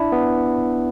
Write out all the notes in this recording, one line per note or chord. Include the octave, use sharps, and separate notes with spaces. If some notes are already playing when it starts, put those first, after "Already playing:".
Already playing: D4 E4
B3